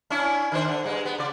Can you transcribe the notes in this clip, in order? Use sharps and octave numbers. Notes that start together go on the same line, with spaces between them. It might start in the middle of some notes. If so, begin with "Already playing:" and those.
C#4 D4 E4
D#3 D4 C5
D3
G2 G#3
B3
C#3 D5